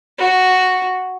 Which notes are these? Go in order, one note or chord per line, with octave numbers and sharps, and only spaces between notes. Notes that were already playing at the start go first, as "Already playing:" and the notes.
F#4